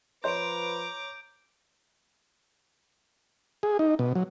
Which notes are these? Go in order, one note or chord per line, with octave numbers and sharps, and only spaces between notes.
F3 B4 C#5 A#5 C6 D6 G6 D7
G#4
D#4
B2
F#3